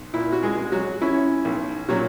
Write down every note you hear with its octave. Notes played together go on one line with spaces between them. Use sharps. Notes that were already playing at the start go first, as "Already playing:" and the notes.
Already playing: B1
A#2 E4
F#4
G#3 G#4
G#3
F#3 F#4
C#4 E4
B1
A#2 F#3 F#4